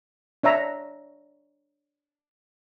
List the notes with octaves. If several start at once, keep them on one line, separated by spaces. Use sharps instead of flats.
D4 C#5 E5 A#5